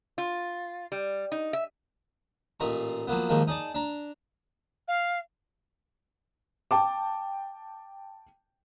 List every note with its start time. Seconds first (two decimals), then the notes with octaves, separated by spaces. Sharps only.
0.18 F4
0.92 G3
1.32 D#4
1.53 E5
2.60 A1 A#2 D#5 A#5 C6 C#6
3.07 F3 F#3 A#3 B3
3.29 D#2 G#2 D#3 F3 G#3 A#3
3.47 D#4 G#4 D5 A5
3.75 D4 A#5
4.88 F5
6.71 G5 A5 D6